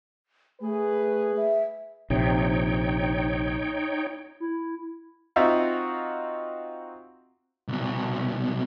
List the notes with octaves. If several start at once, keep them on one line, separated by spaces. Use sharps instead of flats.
A3 G#4 B4
E5
A#1 C3 D#4 C#5 G5
E4
C4 D#4 F4 F#4 E5 F5
C2 B2